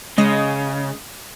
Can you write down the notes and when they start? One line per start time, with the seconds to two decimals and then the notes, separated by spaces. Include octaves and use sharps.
0.18 C#3 G#3 D#5